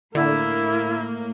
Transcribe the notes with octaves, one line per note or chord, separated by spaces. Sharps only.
A2 D3 A#3 E4